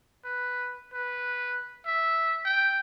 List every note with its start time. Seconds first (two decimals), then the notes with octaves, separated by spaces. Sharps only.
0.25 B4
0.93 B4
1.86 E5
2.45 G5